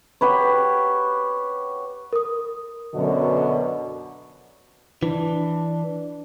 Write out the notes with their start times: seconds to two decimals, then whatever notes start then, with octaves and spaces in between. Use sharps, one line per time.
0.21 F#4 G4 B4 C#5
2.13 A#4 D#6
2.94 F#2 B2 D3
5.03 E3 D4